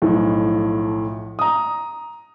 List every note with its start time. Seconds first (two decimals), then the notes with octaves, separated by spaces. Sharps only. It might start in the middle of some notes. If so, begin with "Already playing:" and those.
0.02 B1 A2 F3
1.39 A#5 D#6